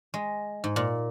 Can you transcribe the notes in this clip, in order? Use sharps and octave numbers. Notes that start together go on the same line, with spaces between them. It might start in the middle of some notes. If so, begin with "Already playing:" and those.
G#3
G#2
A#2